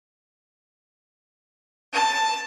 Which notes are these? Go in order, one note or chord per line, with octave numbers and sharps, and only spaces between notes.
A5